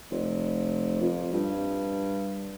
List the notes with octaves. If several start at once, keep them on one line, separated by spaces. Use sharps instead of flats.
F1
F2
G2